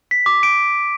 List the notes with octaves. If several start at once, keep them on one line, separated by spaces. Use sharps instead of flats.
B6
D6
D7